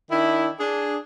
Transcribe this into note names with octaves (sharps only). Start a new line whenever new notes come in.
D#3 D4 E4
D4 G#4